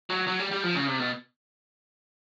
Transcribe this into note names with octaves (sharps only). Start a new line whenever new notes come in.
F#3
F#3
G3
G3
F3
C#3
C3
B2